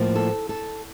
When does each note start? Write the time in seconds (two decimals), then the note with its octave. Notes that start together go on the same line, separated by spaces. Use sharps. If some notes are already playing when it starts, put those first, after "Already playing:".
Already playing: A2 F3 A#3
0.16 A4
0.49 A4